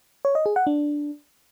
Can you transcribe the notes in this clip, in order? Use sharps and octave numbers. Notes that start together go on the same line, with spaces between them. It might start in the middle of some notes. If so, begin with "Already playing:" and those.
C#5
D#5
G#4
F#5
D4